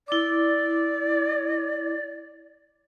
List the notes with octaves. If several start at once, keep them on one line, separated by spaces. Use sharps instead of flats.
E4 D5 D6